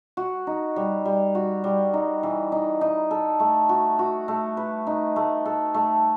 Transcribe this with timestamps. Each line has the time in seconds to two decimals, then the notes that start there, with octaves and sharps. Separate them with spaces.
0.17 F#4
0.47 D#4
0.76 G3
1.05 G3
1.35 F#4
1.64 G3
1.94 D#4
2.23 E3
2.52 D#4
2.81 D#4
3.11 A4
3.40 A3
3.69 F#4
3.99 F#4
4.28 A3
4.57 B4
4.87 D#4
5.16 A3
5.46 A4
5.74 A3